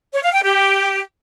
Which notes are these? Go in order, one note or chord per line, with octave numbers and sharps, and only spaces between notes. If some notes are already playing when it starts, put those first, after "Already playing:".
C#5
F5
G5
G4